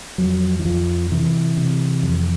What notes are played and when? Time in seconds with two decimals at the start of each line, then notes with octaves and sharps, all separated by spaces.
0.18 F2 F#3
0.59 E3
0.65 F2 F3
1.11 C3 E3
1.57 C3
2.03 F2